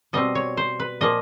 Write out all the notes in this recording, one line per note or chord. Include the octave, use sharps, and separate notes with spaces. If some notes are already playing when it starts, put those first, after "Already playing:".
B2 G3 C4 D#5
C#5
C5
B4
A#2 F3 A#3 D#5